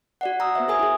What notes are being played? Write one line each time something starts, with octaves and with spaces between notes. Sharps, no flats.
F#4 D5 F#5
F#4 A#5 D#6 E6
B3 C5 E5
G#4 A#4 G#5 D#6
E4 G#4